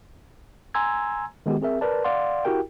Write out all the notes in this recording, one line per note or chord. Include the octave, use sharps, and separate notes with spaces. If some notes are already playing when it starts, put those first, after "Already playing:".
G#5 A#5 C6 E6 G#6
D#3 G#3 B3 F#4 G4
C4 G#4 A#4 E5
A#4 B4 D5 A5
D5 F5 F#5 C6
E4 F#4 G4 A#4 G5